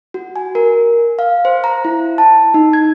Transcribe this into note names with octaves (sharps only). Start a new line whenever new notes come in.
F#4
G#5
A#4
F5
C5
A#5
E4
A5
D#4
G#6